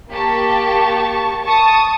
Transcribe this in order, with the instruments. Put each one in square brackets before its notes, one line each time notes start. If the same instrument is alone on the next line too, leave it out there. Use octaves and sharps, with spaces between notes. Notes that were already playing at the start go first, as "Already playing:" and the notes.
[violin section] A#3 G4 A5 C#6
A5 C#6 D#6